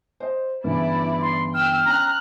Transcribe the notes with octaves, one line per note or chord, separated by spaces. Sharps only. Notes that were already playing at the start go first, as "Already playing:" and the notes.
C5 D#5
G1 C#3 E3 E4 D5
C6
G5 E6 F6 G6
C#4 G5 A#5 F#6